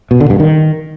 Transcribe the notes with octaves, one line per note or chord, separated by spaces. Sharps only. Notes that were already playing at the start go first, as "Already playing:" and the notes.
B2
D3
G2
D#3